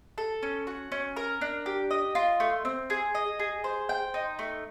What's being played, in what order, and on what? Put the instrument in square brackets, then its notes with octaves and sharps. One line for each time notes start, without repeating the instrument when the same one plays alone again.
[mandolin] A4
C#4
F#4
C#4
A#4
D4
G4
D#5
F4
A3
C4
G#4
D#5
G#4
C5
G5
D#4
A3